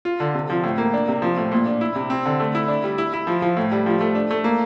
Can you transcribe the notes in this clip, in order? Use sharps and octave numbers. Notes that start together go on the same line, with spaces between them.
F4
D3
C3
F3
A2
A#3
D4
C3
F3
A2
A#2
D4
E4
C3
C4
D3
A3
E4
D4
G3
E4
E4
F3
F3
A2
G3
F3
A3
D4
A3
A#3